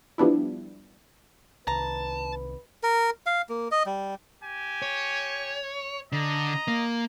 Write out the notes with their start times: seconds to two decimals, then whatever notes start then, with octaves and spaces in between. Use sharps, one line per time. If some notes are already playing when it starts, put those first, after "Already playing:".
0.18 F3 G3 B3 D4 E4
1.68 C2 D#3 B4 A5 A#5
2.83 A#4
3.26 F5
3.49 A#3
3.71 D#5
3.86 G3
4.42 G4 G#5
4.82 C#5
6.12 D3 D#5 A#5
6.68 A#3